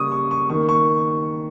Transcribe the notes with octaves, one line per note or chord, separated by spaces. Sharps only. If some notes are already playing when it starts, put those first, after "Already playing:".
Already playing: C#3 G3 A#3 C#6 D#6
C#6
C#6
D#3 A#3 C#6
C#6